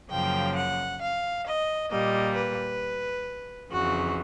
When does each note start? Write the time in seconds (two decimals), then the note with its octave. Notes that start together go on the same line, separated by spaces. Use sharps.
0.10 F#2 C#3 F3 A#3 G5
0.56 F#5
1.01 F5
1.46 D#5
1.90 A#2 G3 A#3 D#5
2.35 B4
3.70 F2 C#3 E3 F#4